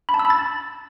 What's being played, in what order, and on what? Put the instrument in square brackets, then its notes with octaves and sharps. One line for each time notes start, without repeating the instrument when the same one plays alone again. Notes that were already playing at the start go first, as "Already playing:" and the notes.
[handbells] B5
A5
E6
B5
A6